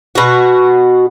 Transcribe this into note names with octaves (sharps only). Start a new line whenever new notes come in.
B2 F#4